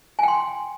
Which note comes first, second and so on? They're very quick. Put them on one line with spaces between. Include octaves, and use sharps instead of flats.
G#5 G5 C6